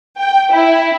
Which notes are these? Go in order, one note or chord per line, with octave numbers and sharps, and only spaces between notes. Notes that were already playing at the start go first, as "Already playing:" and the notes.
G5
E4